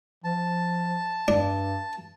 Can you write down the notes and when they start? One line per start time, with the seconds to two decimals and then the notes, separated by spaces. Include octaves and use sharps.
0.24 F3 A5
1.28 G2 D4